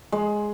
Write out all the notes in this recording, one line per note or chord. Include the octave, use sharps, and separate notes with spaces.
G#3